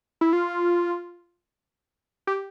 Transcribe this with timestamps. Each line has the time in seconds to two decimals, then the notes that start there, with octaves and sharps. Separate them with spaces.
0.21 E4
0.33 F4
2.27 G4